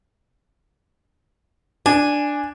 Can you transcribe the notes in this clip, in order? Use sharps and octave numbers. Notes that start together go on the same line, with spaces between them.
D4 G#5